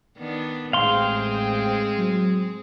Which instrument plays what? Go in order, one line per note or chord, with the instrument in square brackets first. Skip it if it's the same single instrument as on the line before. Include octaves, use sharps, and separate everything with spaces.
[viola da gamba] D#3 B3 D4
[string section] A1 C5 G5 [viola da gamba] G#3 C4 G#4 [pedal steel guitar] F5 C6
[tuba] F#3